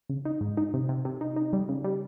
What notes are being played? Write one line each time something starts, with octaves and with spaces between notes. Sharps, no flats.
C#3
D#4
G#2
D#4
C3
C3
C3
D#4
D#4
G3
C#3
G3